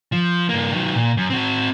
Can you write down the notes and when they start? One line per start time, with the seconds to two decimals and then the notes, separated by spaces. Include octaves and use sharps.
0.12 F3
0.49 G2 A#3
0.72 D#3 F#3
0.95 A#2
1.17 F#2
1.30 C4 F#4